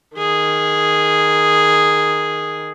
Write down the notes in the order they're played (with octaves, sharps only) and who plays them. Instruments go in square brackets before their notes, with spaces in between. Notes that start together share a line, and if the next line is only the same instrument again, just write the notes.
[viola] D#3 G#4